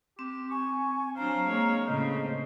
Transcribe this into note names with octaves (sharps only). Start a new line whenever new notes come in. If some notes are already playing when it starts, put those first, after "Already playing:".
C4 G4
G#5 C#6
F#3 D4 C5 F5 A#5
G#3 A#3 C#5
A2 C#3 C5 D#5